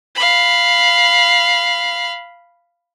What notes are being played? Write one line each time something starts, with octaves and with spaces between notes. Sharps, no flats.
F5 B5